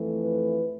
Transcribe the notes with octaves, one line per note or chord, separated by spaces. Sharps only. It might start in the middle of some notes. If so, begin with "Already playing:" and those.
Already playing: F2 E3 A3
B4